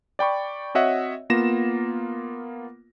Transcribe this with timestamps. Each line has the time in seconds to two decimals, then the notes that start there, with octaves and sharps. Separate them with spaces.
0.19 D5 G5 B5 C#6
0.74 C4 F#4 C#5 D#5 E5 F#5
1.30 A#3 B3 F4 A#6 E7